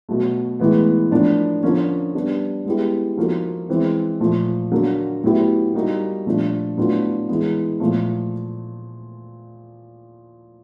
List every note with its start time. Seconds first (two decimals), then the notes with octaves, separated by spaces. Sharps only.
0.09 B2 F#3 A3
0.60 A2 E3 G#3 B3
1.11 A2 F3 A#3 D4
1.63 D3 F3 A#3 C#4
2.14 G3 B3 D4
2.66 G#3 B3 E4 G4
3.17 F3 A#3 D#4 F#4 A4
3.69 E3 G#3 C4 E4
4.20 A#2 F3 A3
4.71 D3 F#3 A#3
5.24 A2 F#3 B3 E4 G4
5.74 G3 A#3 D#4 F#4
6.26 A#2 F3 A3 D4
6.77 A2 F#3 B3 D4 F4
7.28 E3 G#3 B3
7.80 A#2 F3 A3